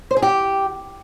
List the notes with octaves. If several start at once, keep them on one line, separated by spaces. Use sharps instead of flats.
C5
G#4
G4